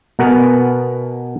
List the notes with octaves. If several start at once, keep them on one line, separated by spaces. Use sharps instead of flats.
B2 B3 A#4 F#5 G#5